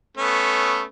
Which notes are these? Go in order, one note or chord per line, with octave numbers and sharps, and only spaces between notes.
A3 B3 C#4